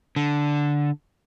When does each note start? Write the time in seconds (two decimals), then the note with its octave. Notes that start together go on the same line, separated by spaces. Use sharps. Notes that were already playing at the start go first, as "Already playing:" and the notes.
0.16 D3